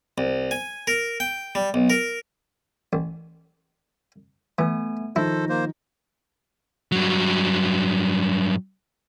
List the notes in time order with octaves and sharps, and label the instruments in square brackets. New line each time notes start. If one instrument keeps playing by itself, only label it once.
[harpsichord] C2
G#5
A#4
G5
G3
B1
A#4
A1
[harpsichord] E3 [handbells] A3 B3 G#5
[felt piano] D#3 F3 [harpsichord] E4 [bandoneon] A4 C5 [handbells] A#6
[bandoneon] A#3 C5
[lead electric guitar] G2 F#3